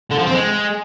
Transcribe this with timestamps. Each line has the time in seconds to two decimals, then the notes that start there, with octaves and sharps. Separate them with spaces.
0.11 D3
0.19 F3
0.26 C4
0.34 G#3